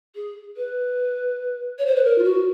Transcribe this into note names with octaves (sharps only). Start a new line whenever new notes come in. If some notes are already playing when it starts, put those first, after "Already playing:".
G#4
B4
C#5
C5
B4
A#4
F4
F#4